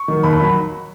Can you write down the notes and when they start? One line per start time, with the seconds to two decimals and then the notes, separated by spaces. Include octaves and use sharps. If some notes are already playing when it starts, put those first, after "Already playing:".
Already playing: C#6
0.08 D#3 F#3
0.23 D#2 B5
0.34 B5
0.39 D#3 F#3